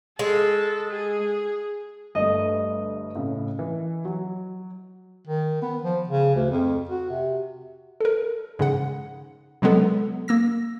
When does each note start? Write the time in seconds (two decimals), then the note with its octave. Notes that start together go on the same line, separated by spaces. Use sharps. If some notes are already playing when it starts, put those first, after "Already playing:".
0.19 G#3 A4
0.91 G#4
2.15 G1 A3 D#5
3.16 A2 C#3
3.59 E3
4.05 F#3
5.27 D#3
5.62 B3
5.82 F3
6.08 C#3
6.35 D2
6.51 F2
6.89 F#4
7.10 C3
8.00 A4 A#4
8.59 G#2 C#3 F#5
9.62 C3 F#3 G#3 B3 A4
10.28 A#3 E6 A#6